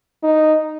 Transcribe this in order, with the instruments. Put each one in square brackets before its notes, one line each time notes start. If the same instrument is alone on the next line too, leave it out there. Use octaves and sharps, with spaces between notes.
[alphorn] D#4